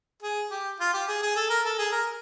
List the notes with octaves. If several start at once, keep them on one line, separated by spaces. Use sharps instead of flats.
G#4
G4
F4
G4
G#4
G#4
A4
A#4
A4
G#4
A#4